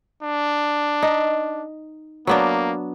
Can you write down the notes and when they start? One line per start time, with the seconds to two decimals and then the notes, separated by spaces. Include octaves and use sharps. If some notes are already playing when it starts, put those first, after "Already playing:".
0.23 D4
1.03 D#4
2.27 F#3 A#3 B3 D4